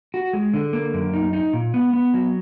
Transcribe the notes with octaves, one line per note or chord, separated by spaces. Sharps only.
F#4
G#3
D3
A#3
F#2
D#4
D#4
A#2
B3
B3
F#3